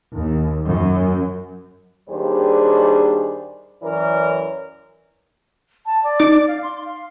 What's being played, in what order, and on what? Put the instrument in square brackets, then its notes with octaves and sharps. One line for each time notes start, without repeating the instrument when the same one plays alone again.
[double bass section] D#2
F#2
[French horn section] D#2 G3 D4 G#4 C5
F#2 E3 A#4 C#5 D5
[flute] A5
D5
[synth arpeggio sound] D#4 D6
[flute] F5
C6
F5